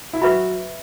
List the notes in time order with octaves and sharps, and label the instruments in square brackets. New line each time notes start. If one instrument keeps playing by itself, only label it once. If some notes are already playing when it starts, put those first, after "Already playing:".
[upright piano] E4
[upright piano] F#3 F#4 [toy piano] B4 E5 B5